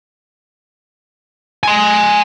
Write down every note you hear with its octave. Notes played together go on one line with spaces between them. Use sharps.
G#5 C6